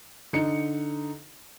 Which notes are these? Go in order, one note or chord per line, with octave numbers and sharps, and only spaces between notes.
D3 D#4 C#7